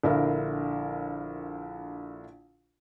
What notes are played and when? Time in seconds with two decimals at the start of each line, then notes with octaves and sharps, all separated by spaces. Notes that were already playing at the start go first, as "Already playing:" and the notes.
0.03 A#1 D3 E4 A#4 F5